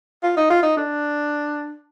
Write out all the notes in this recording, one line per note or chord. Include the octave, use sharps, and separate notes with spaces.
F4
D#4
F4
D#4
D4